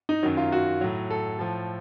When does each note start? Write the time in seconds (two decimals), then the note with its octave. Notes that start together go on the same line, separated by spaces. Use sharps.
0.09 D#4
0.23 F#2 D#3 F#3
0.37 F4
0.52 F#4
0.81 A2 F#3
1.11 A4
1.39 A2 F3 A4